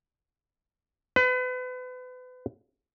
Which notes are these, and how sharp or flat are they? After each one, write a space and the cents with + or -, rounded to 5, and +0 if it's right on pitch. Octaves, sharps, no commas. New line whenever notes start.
B4 +35